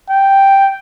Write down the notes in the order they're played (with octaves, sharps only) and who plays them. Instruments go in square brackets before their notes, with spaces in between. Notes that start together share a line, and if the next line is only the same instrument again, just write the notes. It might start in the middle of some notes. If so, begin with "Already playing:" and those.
[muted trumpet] G5